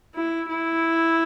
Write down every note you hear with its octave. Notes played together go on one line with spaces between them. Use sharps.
E4
E4